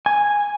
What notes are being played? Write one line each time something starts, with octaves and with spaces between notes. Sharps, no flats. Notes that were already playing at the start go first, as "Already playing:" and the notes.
G#5